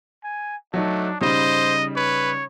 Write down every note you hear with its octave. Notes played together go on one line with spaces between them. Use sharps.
G#5
F#3 A3 D4 D#4
C#3 G3 D#4 C5 D#5
B4 C#5